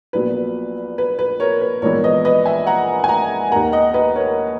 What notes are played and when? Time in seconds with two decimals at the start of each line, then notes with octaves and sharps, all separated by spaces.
0.13 A#1 A#2 F#3 B3 B4
0.98 B4
1.19 B4
1.40 A#4 C#5
1.61 B4
1.82 A#1 G#2 E3 B3 A#4 C#5
2.04 B4 D#5
2.25 B4 D#5
2.46 E5 G#5
2.67 F#5 A#5
3.04 G#5
3.09 F#5 A#5
3.51 D#2 D#3 A#3 F#5 A#5
3.72 D#5 F#5
3.94 B4 D#5
4.16 A#4 C#5